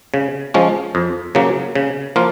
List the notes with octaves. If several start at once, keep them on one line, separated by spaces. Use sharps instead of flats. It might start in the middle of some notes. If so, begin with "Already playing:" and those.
C#3
F3 G#3 C#4
F2
C#3 F#3 A#3
C#3
F3 A#3 F4